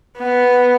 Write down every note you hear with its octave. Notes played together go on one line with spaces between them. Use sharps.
B3